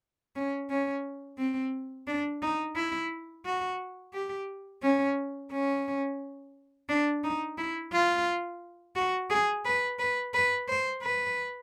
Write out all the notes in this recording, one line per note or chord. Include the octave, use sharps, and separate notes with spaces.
C#4
C#4
C4
D4
D#4
E4
F#4
G4
C#4
C#4
D4
D#4
E4
F4
F#4
G#4
B4
B4
B4
C5
B4